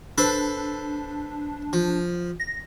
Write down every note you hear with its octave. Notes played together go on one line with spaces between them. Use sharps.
D4 A4 B4 C5
F3
A#6